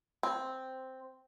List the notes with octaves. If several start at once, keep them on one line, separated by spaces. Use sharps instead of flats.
C4